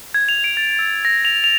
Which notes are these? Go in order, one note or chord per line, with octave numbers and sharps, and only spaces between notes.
G#6
F7
D7
A6
E6
A#6
F7
F7